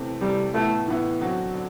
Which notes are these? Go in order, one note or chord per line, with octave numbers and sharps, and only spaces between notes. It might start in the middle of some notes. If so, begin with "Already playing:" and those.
Already playing: C3 E3 A3 C4
C3 E3 G3 A3 C4
A2 E3 A3 B3 E4
A2 E3 B3 E4
D3 F#3 C4 F#4
D3